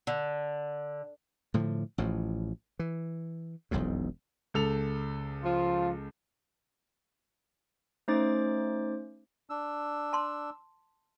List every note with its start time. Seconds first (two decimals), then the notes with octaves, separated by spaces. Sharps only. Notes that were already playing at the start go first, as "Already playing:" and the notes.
0.07 D3
1.54 A2 D3 F3
1.98 A1 A2 F3
2.79 E3
3.71 E1 B1 F2 G#2
4.54 C#2 A4 F7
5.44 F3 F4
8.08 A3 C#4 D#4 C5 D6 A6
9.50 D4 E6
10.13 A5 C6